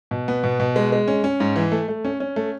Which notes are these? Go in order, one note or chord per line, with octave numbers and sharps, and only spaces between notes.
B2
B3
B2
B2
G#3
G#3
C#4
C#4
G#2
E3
A3
A3
C#4
C#4
A3